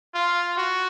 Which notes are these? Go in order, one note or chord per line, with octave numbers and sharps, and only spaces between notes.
F4
F#4